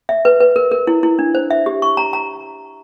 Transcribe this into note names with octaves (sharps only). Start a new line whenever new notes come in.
E5
B4
B4
A#4
A#4
E4
E4
D4
C5
E5
G4
C#6
A#5
A#5